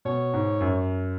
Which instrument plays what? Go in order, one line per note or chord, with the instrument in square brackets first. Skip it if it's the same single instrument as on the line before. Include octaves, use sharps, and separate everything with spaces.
[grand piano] B2 [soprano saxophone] C#5
[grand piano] G#2
F#2